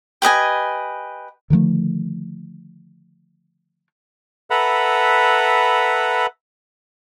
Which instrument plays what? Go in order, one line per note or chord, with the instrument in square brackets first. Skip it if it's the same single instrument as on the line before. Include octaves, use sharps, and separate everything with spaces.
[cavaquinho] G4 B4 D#5 G#5
[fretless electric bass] D3 D#3 F3 A3
[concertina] A4 B4 E5 F#5 A#5 B5